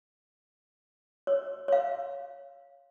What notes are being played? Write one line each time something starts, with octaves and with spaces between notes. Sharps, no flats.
C#5
C#5 F5